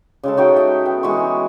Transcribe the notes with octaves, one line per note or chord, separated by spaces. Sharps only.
C#3 G#3 A4
D#4 F#4 G5
E5
B3 G5
E3 G#3 F#4 C#6